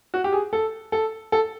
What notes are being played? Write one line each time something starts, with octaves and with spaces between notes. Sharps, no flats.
F#4
G4
G#4
A4
A4
A4